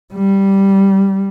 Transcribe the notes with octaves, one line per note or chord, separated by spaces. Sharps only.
G3